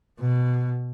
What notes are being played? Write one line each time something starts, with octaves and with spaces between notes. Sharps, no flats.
B2